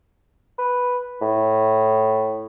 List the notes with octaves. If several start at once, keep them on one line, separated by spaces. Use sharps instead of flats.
B4
A2